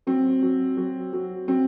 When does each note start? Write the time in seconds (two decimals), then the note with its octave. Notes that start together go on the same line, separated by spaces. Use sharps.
0.07 F#3 C4
0.42 F#3
0.77 F#3
1.13 F#3
1.48 F#3 C4